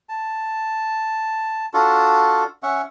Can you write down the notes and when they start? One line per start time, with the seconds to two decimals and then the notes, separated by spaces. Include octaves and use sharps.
0.09 A5
1.74 D4 F4 F#4 A4
2.63 C#4 E5 F#5 C#6